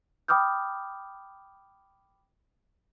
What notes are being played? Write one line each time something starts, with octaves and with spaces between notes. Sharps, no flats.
G5 B5 D6 D#6 F6 G6